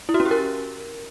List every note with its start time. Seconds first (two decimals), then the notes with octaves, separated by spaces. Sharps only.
0.09 E4
0.14 F#4
0.20 C#4
0.25 G4
0.31 A#4